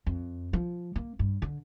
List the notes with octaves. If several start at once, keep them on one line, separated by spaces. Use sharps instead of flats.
F2
F3
A#3
G2
D3